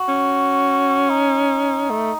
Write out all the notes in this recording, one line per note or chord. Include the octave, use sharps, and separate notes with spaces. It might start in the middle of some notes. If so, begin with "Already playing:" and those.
Already playing: F#4
C#4
D#4
A3